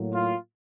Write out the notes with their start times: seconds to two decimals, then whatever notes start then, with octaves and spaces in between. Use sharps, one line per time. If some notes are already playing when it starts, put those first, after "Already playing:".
Already playing: A2 F#3 A#3
0.14 F4